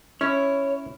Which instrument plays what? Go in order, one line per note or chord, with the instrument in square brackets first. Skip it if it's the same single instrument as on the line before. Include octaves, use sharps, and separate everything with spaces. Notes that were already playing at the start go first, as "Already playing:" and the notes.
[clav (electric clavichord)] C#4 [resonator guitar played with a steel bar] E4 [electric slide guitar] C#5